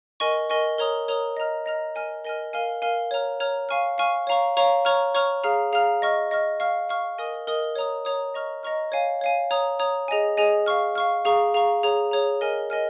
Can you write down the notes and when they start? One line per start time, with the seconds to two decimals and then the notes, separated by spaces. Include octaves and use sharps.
0.20 A#4 D#5 G#5 C#6
0.50 A#4 D#5 G#5 C#6
0.78 A#4 C#5 A#5 D#6
1.08 A#4 C#5 A#5 D#6
1.37 D#5 A#5 F6
1.66 D#5 A#5 F6
1.95 A#4 D#5 G#5 F6
2.24 A#4 D#5 G#5 F6
2.53 A#4 F5 G#5 F6
2.82 A#4 F5 G#5 F6
3.11 C#5 A#5 F6
3.40 C#5 A#5 F6
3.69 F5 G#5 C#6 F6
3.98 F5 G#5 C#6 F6
4.27 C#5 F5 A#5 C#6
4.57 C#5 F5 A#5 C#6
4.85 C#5 A#5 C#6 F6
5.15 C#5 A#5 C#6 F6
5.44 G#4 F5 A#5 F6
5.73 G#4 F5 A#5 F6
6.02 D#5 C#6 F6
6.31 D#5 C#6 F6
6.60 F5 C#6 F6
6.89 F5 C#6 F6
7.18 A#4 D#5 G#5 D#6
7.47 A#4 D#5 G#5 D#6
7.75 C#5 A#5 D#6
8.05 C#5 A#5 D#6
8.34 D#5 A#5 C#6 F6
8.63 D#5 A#5 C#6 F6
8.92 C#5 F5 G#5
9.21 C#5 F5 G#5
9.51 C#5 A#5 D#6
9.79 C#5 A#5 D#6
10.08 G#4 D#5 G#5
10.37 G#4 D#5 G#5
10.66 F5 C#6 F6
10.95 F5 C#6 F6
11.25 G#4 F5 A#5 C#6
11.54 G#4 F5 A#5 C#6
11.83 G#4 C#5 A#5
12.11 G#4 C#5 A#5
12.41 A#4 D#5 G#5 F6
12.70 A#4 D#5 G#5 F6